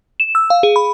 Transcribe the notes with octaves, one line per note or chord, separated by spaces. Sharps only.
E7
E6
F5
G#4
B5